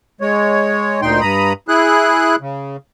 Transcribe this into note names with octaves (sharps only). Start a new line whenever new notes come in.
G#3 C#5
D2 A#2 D#4 G5 C6
G2 A#5 B5 D#6
E4 G#4 F#6
C#3